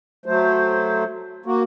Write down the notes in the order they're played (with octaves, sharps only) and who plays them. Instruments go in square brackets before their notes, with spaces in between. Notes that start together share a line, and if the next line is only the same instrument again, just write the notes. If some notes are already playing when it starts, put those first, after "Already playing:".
[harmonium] F#3 A3 C5
A#3 F#4